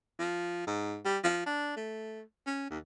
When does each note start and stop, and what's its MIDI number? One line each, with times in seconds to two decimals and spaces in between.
0.19 0.65 53
0.67 0.98 44
1.05 1.18 55
1.24 1.45 53
1.46 1.73 62
1.77 2.22 57
2.46 2.67 61
2.70 2.78 39